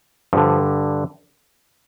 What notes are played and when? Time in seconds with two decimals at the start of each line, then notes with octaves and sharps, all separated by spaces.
0.33 G2 D3 F3